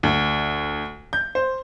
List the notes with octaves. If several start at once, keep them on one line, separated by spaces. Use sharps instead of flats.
D2
G6
C5